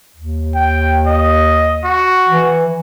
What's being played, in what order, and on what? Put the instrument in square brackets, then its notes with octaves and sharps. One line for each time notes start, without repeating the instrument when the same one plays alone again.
[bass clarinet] D#2
[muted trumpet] G5
D#5
F#4
[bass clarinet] E3